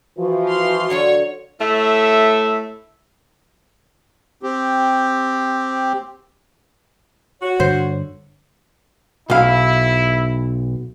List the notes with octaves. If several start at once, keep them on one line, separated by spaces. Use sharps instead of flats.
E3 F3 F#4
F5 C6
D3 F#3 F4 C#5
A2 A3 E5
C4 G4
F#4 C#5
G2 D3 C5 C#5
B1 E4 F5